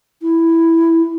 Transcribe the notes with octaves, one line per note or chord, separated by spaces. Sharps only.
E4